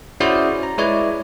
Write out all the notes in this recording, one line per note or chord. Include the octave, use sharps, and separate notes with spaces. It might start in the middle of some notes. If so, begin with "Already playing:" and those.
C#4 E4 F#4 G#4 C5 D5
A#5
G#3 E4 B4 C#5 D5